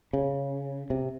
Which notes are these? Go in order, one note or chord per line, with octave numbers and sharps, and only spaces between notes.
C#3
C3